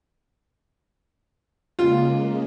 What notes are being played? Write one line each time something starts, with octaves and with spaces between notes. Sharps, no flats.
C#3 G#3 A#3 F4